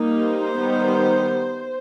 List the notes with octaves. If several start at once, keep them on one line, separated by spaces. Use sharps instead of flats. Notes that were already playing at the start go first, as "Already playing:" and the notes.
Already playing: G3 A#3 D#4
C5
D#3 G3 B3 D#4